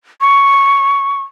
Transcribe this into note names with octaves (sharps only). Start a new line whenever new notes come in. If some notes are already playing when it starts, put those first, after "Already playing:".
C#6